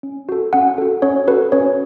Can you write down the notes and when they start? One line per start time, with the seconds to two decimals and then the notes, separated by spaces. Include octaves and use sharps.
0.03 C#4
0.29 F#4 A4
0.53 C#4 F#5
0.78 F#4 A4
1.02 C#4 C#5
1.27 F#4 A4 B4
1.52 C#4 C#5